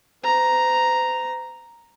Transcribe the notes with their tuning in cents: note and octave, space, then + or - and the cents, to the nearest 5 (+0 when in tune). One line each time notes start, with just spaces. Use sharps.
C5 -40 A#5 +0